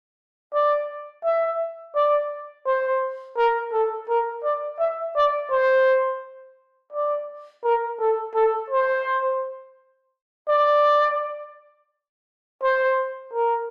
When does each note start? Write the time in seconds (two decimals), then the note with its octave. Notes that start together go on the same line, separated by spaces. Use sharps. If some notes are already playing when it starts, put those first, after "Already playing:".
0.54 D5
1.24 E5
1.95 D5
2.66 C5
3.37 A#4
3.73 A4
4.09 A#4
4.44 D5
4.79 E5
5.16 D5
5.51 C5
6.93 D5
7.64 A#4
8.00 A4
8.35 A4
8.70 C5
10.48 D5
12.62 C5
13.34 A#4